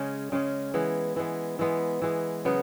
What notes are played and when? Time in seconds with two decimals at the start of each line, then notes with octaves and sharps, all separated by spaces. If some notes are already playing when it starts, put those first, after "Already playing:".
Already playing: C#3 G#3 C#4
0.32 C#3 G#3 C#4
0.74 E3 G#3 B3
1.16 E3 G#3 B3
1.59 E3 G#3 B3
2.02 E3 G#3 B3
2.45 C#3 F#3 B3